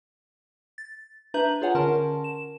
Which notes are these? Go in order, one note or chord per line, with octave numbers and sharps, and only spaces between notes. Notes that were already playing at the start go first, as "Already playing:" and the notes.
A6
D4 B4 E5 A#5 G6 F#7
F4 G#4 C#5 F#5 G#5
D3 C#4 A#4 A5 C6
E7